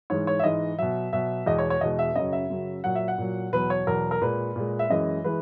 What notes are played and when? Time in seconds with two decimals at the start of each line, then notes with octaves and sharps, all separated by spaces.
0.10 G#2 E3 G#3 C#5
0.27 C#5
0.39 E5
0.44 G#2 E3 G#3 D#5
0.78 B2 F#3 E5
1.13 B2 F#3 E5
1.46 E2 B2 G#3 D#5
1.58 C#5
1.70 C#5
1.81 E2 B2 G#3 D#5
1.99 E5
2.16 F#2 C#3 F#3 D#5
2.33 E5
2.50 F#2 C#3 F#3
2.84 A#2 F#3 F#5
2.95 E5
3.08 F#5
3.18 A#2 F#3
3.53 E2 B2 F#3 B4
3.70 C#5
3.87 E2 B2 F#3 A#4
4.11 A#4
4.21 A#2 G#3 B4
4.56 A#2 G#3
4.79 E5
4.90 F#2 E3 G#3 D#5
5.24 E3 G#3 B4